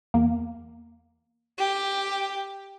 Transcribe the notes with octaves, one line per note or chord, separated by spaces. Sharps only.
E2 A#3
G4